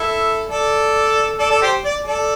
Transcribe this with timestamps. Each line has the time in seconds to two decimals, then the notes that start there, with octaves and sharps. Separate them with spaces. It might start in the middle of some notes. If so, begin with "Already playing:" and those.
Already playing: E4 A4
0.48 A4 D5
1.39 A4 D5
1.50 A4 D5
1.62 G4 C5
1.85 D5
2.06 A4 D5